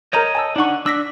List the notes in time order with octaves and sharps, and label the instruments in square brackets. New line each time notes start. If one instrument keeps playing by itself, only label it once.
[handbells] A#4 A#5 G6 [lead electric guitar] C#5 D#5
[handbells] G#5 A5 E6
[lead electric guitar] D4 F#5 [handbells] D#4 C#6
[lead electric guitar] D4 [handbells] E6 A#6 B6